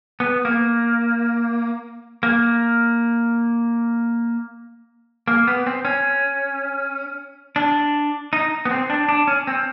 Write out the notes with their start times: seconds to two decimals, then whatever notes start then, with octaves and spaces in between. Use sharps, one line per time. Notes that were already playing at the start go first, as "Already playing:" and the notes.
0.20 B3
0.45 A#3
2.23 A#3
5.28 A#3
5.48 B3
5.67 C4
5.85 C#4
7.56 D4
8.33 D#4
8.65 B3
8.71 C4
8.90 D4
9.09 D4
9.27 C#4
9.47 C4